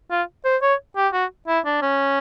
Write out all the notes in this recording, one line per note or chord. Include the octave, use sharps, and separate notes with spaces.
F4
C5
C#5
G4
F#4
E4
D4
C#4